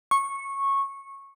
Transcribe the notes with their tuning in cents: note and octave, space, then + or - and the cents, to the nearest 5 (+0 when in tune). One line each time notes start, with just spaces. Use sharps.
C#6 -15